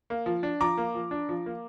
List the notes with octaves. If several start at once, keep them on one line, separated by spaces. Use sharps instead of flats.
A#3
F3
D4
F3 A#5 D6
A#3
F3
D4
F3
A#3